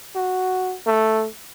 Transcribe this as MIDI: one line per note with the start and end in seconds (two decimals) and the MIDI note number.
0.15 0.75 66
0.86 1.26 57